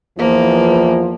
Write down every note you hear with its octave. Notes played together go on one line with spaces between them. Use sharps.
E2 E3 F3 A#3